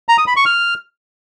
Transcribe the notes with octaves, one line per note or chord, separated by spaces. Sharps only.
A#5
D#6
B5
C#6
F6